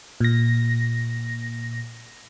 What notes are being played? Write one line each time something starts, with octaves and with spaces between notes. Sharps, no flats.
A#2 A#6